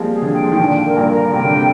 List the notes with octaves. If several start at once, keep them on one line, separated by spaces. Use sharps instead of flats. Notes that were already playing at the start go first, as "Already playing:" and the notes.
Already playing: F3 G3 G#3 A#3 C4
G#4
D3 F3
G5
F3
D#3
A#2 D3 G5
A#4
G2 A#2
A#4
C3 G5
D3
C3